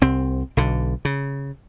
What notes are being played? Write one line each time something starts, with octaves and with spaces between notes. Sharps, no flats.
C2 C4
B1 D3
C#3